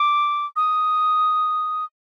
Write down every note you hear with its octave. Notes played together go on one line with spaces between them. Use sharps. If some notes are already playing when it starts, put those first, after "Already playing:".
Already playing: D6
D#6